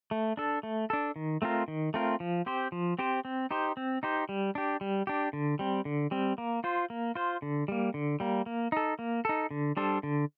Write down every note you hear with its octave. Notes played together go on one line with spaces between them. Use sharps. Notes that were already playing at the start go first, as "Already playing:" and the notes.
A3
D4 A4
A3
D4 A4
D#3
A3 C4 F4 A#4
D#3
A3 C4 F4 A#4
F3
C4 G4 C5
F3
C4 G4 C5
C4
D#4 G4 C5
C4
D#4 G4 C5
G3
D4 G4
G3
D4 G4
D3
G3 C4
D3
G3 C4
A#3
F4 C5
A#3
F4 C5
D3
G3 A#3
D3
G3 A#3
A#3
D#4 A4
A#3
D#4 A4
D3
G3 D4 A4 C5
D3